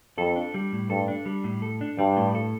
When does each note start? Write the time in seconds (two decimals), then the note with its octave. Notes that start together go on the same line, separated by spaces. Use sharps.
0.18 F2 A4
0.36 D4
0.54 G3
0.73 A2
0.90 G2 A4
1.08 D4
1.26 G3
1.44 A2
1.62 A4
1.81 D4
1.98 G2 G3
2.17 A2
2.35 A4